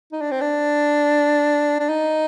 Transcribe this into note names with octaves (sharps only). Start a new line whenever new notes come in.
D#4
D4
C4
D4
D4
D#4